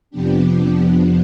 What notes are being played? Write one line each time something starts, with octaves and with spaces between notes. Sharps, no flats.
F2 C3 F3 B3 D4 G4